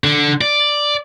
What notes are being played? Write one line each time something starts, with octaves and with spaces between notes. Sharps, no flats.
D3
D5